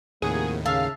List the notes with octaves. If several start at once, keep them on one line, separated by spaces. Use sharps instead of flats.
D#2 A2 C3 D#3 F3 A#3 G#4 F#5
C#3 E5 F5 A5